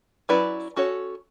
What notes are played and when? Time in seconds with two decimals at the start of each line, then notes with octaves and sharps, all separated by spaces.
0.29 F#3 C#4 E4 B4 D5
0.76 C#4 F#4 A4 C#5